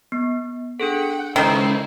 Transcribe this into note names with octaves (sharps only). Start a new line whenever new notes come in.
B3
D4 G#4 A4 F#5 G5
C#2 D#3 E4 A4 A#4 C5